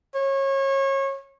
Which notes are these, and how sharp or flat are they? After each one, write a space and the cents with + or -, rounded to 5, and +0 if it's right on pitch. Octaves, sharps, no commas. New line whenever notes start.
C#5 -30